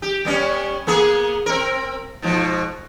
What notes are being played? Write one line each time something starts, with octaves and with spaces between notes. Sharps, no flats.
G4
G3 B3 C#4
A#3 B3 G#4
C4 A#4
G#2 B2 F3